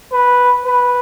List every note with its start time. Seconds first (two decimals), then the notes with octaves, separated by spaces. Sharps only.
0.12 B4
0.65 B4